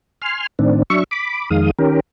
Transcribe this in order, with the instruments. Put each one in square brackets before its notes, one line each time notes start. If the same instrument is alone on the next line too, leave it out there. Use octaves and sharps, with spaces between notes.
[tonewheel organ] G#5 C6 F6
A2 D#3 C4 D4
F#3 D4 E5 C#6
B5 D6
F2 D#3 G#3 F5 D#6
D#3 C#4 G4 A#4